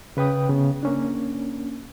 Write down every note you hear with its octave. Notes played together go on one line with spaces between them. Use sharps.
C#3 B4 G5 D#6
C#3 B3
A#3 C#4 D4